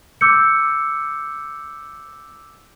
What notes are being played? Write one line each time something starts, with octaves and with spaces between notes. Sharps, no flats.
D6 E6 G6 C#7